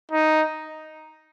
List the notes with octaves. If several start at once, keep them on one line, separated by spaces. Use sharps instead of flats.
D#4